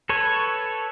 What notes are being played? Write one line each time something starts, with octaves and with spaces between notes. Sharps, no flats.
A4 B4 C#5